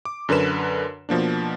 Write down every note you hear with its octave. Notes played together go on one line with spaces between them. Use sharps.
D6
F#2 D3 A#4 B4 E7
B2 F3 A#3 D4